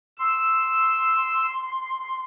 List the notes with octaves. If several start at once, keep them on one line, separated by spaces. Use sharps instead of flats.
C6 E6